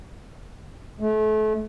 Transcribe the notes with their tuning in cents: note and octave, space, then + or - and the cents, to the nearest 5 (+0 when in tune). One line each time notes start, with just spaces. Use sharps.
A3 -35